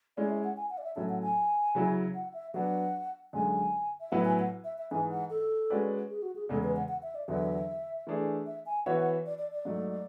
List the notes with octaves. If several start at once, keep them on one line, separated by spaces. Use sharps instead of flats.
G#3 C#4 E4 D5
E5
F#5
G#5
F#5
D5
E5
A2 F#3 C#4 E4 A4 E5
F#5
G#5
C#3 F#3 C#4 E4
F#5
E5
F#3 B3 D4 F#5
F#2 D3 G#3 G#5
E5
A2 F#3 B3 E4 B4 F#5
G#5
F#5
E5
E5
G#2 E3 G#3 G#5
F#5
A4
G#3 C#4 F#4 B4 D5
G#4
F#4
G#4
E2 C#3 G#3 A4
B4
F#5
F#5
E5
D5
E2 D3 F#3 B3 E5
E3 A3 D4 G#4
E5
G#5
E3 B3 F#4 C#5 E5 F#5
F#5
D5
D5
D5
G#2 F#3 A3